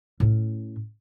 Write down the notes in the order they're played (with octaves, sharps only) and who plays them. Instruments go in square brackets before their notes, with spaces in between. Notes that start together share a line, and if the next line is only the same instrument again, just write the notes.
[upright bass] A2 C#4